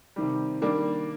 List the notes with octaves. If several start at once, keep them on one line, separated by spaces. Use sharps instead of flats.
C3 D#3 G3
D#3 G3 A#3 D4